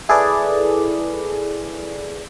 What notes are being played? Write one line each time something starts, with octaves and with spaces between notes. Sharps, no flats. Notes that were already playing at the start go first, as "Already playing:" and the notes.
E4 G#4 A4 B4 D5